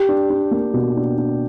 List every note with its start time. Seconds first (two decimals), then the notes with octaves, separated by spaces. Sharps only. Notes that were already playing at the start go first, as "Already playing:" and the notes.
Already playing: G4
0.09 D4
0.30 D4
0.51 A#3
0.74 B2
0.96 D4
1.17 D4